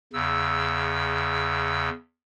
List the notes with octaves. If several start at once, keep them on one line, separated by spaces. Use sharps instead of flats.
E2 C#3 E6